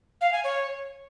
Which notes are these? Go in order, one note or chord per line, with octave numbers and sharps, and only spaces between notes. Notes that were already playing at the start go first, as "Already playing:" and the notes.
F5
G#5
C#5